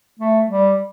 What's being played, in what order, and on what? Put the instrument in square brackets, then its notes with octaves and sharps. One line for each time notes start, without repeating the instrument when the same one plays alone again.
[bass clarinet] A3
G3